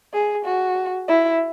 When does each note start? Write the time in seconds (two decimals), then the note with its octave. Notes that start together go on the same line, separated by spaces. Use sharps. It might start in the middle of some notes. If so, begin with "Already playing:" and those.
0.14 G#4
0.45 F#4
1.08 E4